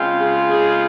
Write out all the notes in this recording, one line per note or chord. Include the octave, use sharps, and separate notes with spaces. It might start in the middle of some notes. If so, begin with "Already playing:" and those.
Already playing: C#3 G#3 C4 F4
G#4
G#4